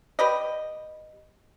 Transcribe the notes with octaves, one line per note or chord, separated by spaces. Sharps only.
G4 B4 D5 D#5